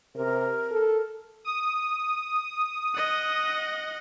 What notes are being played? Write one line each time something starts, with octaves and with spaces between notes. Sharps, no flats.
C3 A#4
A4
D#6
D#5 F#5